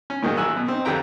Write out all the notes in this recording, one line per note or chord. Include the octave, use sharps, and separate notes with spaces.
C#4
A#2 D#3 F#3 G#3 A#3
A1 F#3 G#5 E6 F#6
B2
C4 D#4
F2 D3 G4 B4 G5 A#5